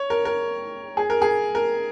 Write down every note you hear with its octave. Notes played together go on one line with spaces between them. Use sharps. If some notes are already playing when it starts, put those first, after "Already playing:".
Already playing: C#5
A#4
A#4
G#4
A#4
G#4
A#4